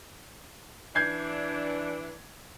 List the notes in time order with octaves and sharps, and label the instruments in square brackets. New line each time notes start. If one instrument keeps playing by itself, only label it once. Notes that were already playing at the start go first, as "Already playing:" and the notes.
[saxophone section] E3 D4 [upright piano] G6 G#6 C7